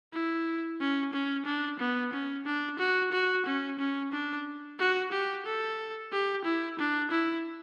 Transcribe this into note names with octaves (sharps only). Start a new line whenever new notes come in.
E4
C#4
C#4
D4
B3
C#4
D4
F#4
F#4
C#4
C#4
D4
F#4
G4
A4
G4
E4
D4
E4